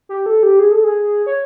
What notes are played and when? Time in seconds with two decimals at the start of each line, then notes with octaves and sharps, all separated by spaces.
0.09 G4
0.26 A4
0.43 G4
0.59 G#4
0.72 A4
0.84 G#4
1.26 C#5